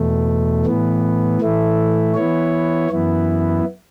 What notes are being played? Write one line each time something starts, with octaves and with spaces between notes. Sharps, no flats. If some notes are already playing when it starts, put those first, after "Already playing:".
Already playing: E2 B2 A3
A2 E3 B3
A2 E3 A3 E4
E3 B3 E4 C#5
F#2 E3 B3 E4